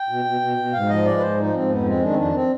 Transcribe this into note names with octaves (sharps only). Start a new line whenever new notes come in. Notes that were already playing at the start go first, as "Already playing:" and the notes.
Already playing: G5
B2
B2
B2
B2
G#2 F5
F3 D#5
G#3 D5
B4
G#2 C5
F3 D#4
G#2 C4
F2 B3
G#3 C4
D#3 D4
C4
F2 D4
C4